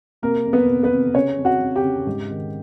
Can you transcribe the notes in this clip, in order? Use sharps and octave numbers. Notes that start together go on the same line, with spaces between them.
C3 A#3 A#4
F2
B3 B4
C3
B3 B4
C3
C#3 C#4 C#5
F2
F#4 F#5
F2
G4 G5
C#3
G#2
D#3